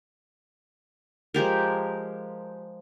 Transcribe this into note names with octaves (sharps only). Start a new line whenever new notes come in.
F3 G#3 G4 A#4